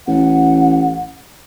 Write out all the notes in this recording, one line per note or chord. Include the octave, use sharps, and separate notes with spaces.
A1 F#5